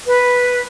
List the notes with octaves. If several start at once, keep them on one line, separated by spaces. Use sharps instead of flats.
B4